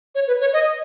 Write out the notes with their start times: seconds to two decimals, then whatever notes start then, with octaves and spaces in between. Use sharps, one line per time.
0.15 C#5
0.27 B4
0.41 C#5
0.53 D#5